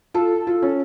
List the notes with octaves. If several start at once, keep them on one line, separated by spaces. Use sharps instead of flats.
F4 A4
F4
C#4